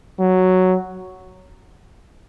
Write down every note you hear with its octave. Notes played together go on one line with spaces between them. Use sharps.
F#3